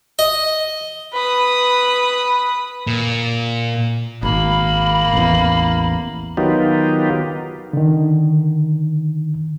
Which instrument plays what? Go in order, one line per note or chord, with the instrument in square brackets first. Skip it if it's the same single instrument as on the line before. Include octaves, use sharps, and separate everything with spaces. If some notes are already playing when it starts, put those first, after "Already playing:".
[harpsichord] D#5
[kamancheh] B4 D#6
[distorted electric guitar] A#2
[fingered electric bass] G#1 [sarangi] A#3 [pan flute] B5
[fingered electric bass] A1 E2
[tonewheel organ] D#3 F#3 B3 D#4 F4 G4
[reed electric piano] D3 D#3